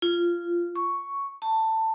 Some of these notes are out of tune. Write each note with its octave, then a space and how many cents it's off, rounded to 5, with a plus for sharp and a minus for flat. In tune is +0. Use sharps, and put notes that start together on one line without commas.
F4 -15
C#6 +5
A5 +15